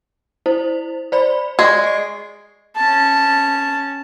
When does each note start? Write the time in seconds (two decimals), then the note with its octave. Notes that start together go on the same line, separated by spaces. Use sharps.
0.46 E4 C5
1.12 C5 D5 B5
1.59 G#3 D5 C#6
1.84 D#5 C7
2.76 C#4 A5